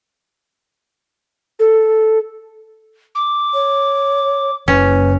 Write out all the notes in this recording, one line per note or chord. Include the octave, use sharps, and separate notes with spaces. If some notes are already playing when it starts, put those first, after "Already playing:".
A4
D6
C#5
F#1 C#4 B4